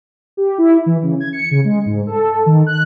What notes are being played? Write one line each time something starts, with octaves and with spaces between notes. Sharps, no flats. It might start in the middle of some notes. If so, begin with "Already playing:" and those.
G4
E4
E3
C#3
G#6
C#7
C#3
G#3
G#2
A4
D#3
F#6